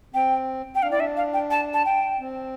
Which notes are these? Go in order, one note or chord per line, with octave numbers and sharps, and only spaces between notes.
C4 G5
G5
D4 F5
E4 D5
D4 E5
F5
G5
A5
A5
G5
C4